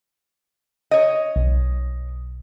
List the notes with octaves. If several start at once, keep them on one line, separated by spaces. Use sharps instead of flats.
C#5 D#5
B1